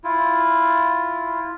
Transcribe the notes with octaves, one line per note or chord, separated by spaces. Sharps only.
E4 F4